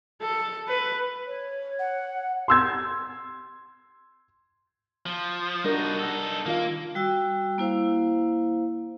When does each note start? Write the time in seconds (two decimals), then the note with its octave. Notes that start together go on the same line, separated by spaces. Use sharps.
0.22 A4
0.68 B4
1.27 C#5
1.79 F#5
2.48 C6 E6 G#6
5.06 F3
5.64 G3 D4 D#4 F#4 A#4
5.99 D#4 A4
6.46 D#3 A#3 F4 F5
6.95 G3 F#4 G5 E6
7.58 A#3 E4 C5 F5